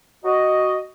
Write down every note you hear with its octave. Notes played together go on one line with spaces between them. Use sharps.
F#4 D#5